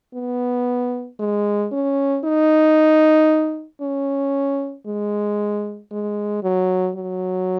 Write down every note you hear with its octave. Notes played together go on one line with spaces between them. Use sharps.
B3
G#3
C#4
D#4
C#4
G#3
G#3
F#3
F#3